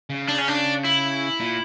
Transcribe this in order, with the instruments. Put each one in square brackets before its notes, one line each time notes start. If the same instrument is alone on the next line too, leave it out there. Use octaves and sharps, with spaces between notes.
[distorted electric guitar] C#3
[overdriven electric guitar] D4
C#4
D4
E4
[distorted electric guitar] A#2